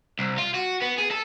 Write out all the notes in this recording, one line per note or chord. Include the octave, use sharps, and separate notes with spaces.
C2
F4
F#4
B3
G#4
A4